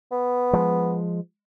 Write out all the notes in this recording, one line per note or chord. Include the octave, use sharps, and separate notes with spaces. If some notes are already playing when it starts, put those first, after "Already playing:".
B3
F3 G#3